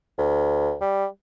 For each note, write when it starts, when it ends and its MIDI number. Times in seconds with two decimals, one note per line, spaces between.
0.18 0.75 38
0.81 1.06 55